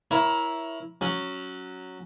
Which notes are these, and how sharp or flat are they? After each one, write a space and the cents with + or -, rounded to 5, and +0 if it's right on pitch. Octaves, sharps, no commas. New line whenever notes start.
E4 +0 A#4 +20 C#5 +0
F#3 +0 C#4 +0